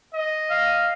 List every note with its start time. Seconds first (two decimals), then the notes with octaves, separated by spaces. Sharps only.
0.14 D#5
0.50 F5